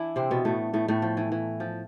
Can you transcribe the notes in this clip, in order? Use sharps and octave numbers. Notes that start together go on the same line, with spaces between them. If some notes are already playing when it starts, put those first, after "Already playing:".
Already playing: E3 D4 E4
C3 C4
B2 B3
A2 A3
A2 A3
A2 A3
F3
E3
E3
F3